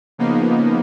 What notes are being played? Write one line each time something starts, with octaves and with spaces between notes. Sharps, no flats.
C#3 F3 A#3 B3 D#4